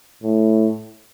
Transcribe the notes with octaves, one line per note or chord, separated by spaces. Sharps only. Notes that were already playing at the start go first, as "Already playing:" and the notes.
A2